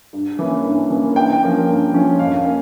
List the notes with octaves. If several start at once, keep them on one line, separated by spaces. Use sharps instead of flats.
G2
E3 A#3 C#4
G2
E3 A#3 C#4
G2 G5
F3 A#3 C#4
G2
F3 A#3 C#4
F2 F5
A#3 C#4